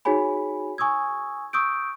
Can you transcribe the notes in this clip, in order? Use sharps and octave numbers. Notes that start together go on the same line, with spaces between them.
D#4 F#4 G#4 C#5 G#5 B5
G#5 C#6 D#6 E6 G#6
C#6 D#6 E6 G6 D7